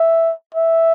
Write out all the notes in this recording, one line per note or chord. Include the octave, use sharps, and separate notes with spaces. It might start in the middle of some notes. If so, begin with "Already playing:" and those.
Already playing: E5
E5